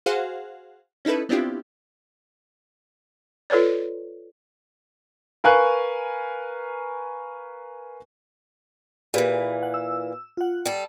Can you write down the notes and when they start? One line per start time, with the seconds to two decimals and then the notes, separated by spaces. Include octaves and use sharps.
0.06 F#4 G#4 C5 F5 F#5
1.05 C#4 D#4 E4 A4 B4
1.29 B3 C4 D4 E4 F4 G4
3.50 F4 A4 B4 C#5 D5
5.44 A#4 B4 F5 G#5 C#6 F#6
9.14 A#2 E3 G4 G#4 B4
9.63 F#5
9.74 E6
10.37 F4 F#5
10.65 G3 A4